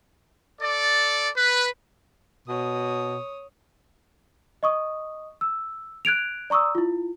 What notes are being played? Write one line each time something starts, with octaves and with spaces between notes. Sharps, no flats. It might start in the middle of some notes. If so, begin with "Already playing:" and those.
A4 D5
B4
B2 C#5 D#6
D#5 C#6 D#6
E6
F#6 G#6 D7 F7
D5 A#5 C#6 D#6 E6
E4 F4